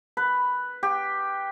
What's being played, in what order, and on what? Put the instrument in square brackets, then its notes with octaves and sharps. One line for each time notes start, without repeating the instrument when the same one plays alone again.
[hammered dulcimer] B4
G4